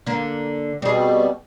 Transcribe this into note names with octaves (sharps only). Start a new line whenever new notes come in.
D3 A#3
B2 G3 C4 G#4